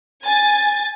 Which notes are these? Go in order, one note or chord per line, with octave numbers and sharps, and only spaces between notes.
G#5 A6